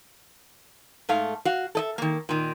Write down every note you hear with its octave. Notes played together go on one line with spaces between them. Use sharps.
G#2 A3 F5
F#4 F5
A4 D#5 E5
D#3 A#3
A#2 D#3